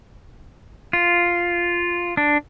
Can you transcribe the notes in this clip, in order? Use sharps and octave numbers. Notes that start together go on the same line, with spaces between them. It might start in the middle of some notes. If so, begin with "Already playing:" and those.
F4
D4